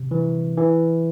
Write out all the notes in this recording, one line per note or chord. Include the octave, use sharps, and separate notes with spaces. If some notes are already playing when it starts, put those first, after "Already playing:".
Already playing: C3
E3
E3